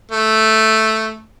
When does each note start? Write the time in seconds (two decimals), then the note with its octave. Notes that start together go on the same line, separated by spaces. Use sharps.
0.11 A3